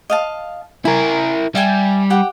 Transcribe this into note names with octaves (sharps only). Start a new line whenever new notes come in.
D#5 F5 A5
E4 A#4 G#5
G3 E5 G5 G#5
G4 F#5 G5